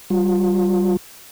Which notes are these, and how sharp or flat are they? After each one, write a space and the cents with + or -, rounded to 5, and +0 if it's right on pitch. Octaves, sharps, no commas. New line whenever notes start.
G3 -20 F4 +25